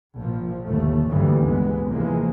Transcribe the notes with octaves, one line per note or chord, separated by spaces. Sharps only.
A#1 A#2 F3
G1 D#2 A3
A1 D2 G2 A#2 E3 G3
C#2 G#3 B3
D#2 C3 E3 F3 G#3 A#3